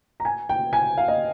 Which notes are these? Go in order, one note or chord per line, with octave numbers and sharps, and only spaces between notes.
A#5
G#5
G5
G#5
F5
D#5